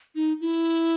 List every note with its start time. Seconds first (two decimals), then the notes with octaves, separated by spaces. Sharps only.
0.15 D#4
0.41 E4